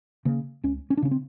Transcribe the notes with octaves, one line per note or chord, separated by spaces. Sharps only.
C#3 A#3
C#2 C#4
C#4
D4
C#3 C#4
C4